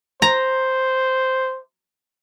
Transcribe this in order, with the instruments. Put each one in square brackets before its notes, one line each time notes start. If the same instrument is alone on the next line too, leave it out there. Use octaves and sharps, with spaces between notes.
[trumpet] C5 [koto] A#5